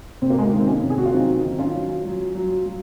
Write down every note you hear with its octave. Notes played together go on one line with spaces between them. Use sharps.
C3 C4
A#3
G#3
A#3
D#3
C4
A#3 C#4
C3
G#4
F#4
F4
F#3 C4 D#4
D#3
C#4 F4
F#3
F#3
F#3
F#3